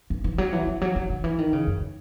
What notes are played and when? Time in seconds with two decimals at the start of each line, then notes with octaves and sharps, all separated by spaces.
0.10 E3
0.24 E3
0.38 F#3
0.53 E3
0.67 E3
0.81 F#3
0.96 E3
1.10 D#3
1.24 E3
1.38 D#3
1.53 C#3
1.67 F#2